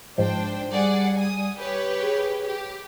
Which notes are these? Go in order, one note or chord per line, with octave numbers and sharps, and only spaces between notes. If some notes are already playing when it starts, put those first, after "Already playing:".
G#2 F3 D4 C5 G5
G3 G#4 D5 F#5
G#5 D#6
G4 B4 C#5
G#4
G4